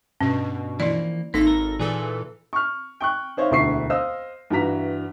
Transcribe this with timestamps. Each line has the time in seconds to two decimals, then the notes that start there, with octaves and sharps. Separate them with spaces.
0.21 G2 B2 C#4
0.80 E3 F3 A#3 E4 D5
1.34 G#1 A#3 D#4 A4 A#6
1.47 A#4
1.80 A#2 E3 G#4 A4
2.53 C#6 F6
3.00 G5 C#6 F#6
3.37 D#4 C5 C#5 E5 F5
3.51 E1 D2 E4 C#6 B6 C7
3.90 C5 D#5 F5 D#6 E6
4.50 G2 E3 F#4 A#5 B6